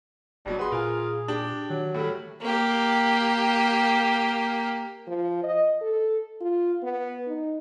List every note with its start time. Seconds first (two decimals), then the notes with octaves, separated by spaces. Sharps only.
0.46 F#1 G2 B2 F#3 G3
0.59 F#4 G#4 B4 C6
0.72 A#2 F4 A#4 G#5
1.28 D4 G4
1.70 D#3 F#3
1.94 A2 G3 A4
2.42 A#3 G4
5.07 F3
5.43 D#5
5.81 A4
6.41 F4
6.83 B3
7.27 D#4